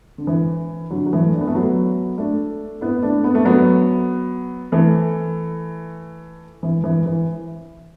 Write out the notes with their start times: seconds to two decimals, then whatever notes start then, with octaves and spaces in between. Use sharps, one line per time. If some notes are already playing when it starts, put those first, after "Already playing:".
0.18 D3
0.27 E3
0.91 D3 F#3
1.06 F#3
1.13 E3 A3
1.33 D4
1.41 B3
1.48 A3
1.55 F#3 B3
2.18 A3 D4
2.81 B3 E4
3.03 A3 D4
3.24 B3
3.35 A3
3.45 F#3 B3
4.72 E3 A3
6.63 E3
6.84 E3
7.06 E3